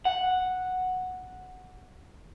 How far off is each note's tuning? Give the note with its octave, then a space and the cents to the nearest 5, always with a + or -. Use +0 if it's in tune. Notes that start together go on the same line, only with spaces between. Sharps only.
F#5 -5